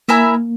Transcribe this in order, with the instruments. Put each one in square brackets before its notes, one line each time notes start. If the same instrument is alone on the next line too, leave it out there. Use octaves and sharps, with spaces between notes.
[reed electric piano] A#3 [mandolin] E4 A#4 E5 G#5